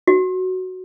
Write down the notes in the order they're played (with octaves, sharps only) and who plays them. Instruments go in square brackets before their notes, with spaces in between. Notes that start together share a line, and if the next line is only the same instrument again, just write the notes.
[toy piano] F#4